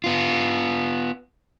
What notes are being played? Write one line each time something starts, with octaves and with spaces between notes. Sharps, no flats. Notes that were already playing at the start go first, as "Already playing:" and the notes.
B3 F4